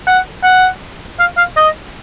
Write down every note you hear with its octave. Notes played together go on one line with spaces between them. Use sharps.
F#5
F#5
F5
F5
D#5